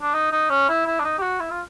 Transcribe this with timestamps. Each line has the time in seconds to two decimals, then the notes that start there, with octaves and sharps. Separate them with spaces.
0.02 D4
0.14 D#4
0.32 D#4
0.50 C#4
0.69 E4
0.86 E4
1.00 D4
1.04 D#4
1.18 G4
1.22 F#4
1.40 E4
1.50 F4